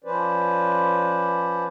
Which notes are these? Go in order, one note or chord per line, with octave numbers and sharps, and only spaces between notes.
F3 C#4 B4 C5 D5